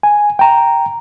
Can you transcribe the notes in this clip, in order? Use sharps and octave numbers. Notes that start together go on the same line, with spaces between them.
G#5
G5 A#5